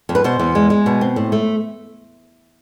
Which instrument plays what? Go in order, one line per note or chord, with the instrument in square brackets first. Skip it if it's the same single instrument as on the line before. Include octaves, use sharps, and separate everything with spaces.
[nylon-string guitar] F2
B4
B2 C5
E2
G#3
G#3
B2
C4
A2
A3